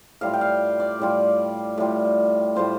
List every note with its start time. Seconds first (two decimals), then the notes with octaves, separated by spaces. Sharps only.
0.21 A2 G3 F4 F5
0.34 G5
0.41 F5
0.80 D5
1.00 A2 G3 F4
1.78 A2 G3 F4
2.56 A2 G3 F4 C5